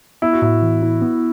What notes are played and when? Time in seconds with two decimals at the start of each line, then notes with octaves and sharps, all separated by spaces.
0.22 B3 E4
0.33 F#4
0.42 A2 E4
0.62 E3
0.83 E4
1.02 B3